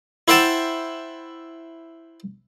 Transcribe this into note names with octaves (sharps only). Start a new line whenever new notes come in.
E4 C5 E5 F#5 G5 A5